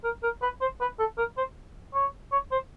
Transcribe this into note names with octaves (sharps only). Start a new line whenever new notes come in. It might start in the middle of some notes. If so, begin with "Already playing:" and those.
A#4
A#4
B4
C5
B4
A4
A#4
C5
C#5
C#5
C5